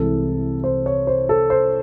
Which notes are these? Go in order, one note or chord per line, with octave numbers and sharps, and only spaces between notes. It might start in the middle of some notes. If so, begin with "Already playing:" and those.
Already playing: C2 C3 E3 G#3 A4
C5
C#5
C5
A4
C5